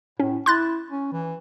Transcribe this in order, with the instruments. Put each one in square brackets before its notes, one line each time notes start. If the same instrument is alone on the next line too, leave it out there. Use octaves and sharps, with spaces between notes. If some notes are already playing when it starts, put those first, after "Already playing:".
[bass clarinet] A2 [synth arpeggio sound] C#4
[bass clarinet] E4 [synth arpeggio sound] C6 F#6 A6
[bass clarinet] C#4
E3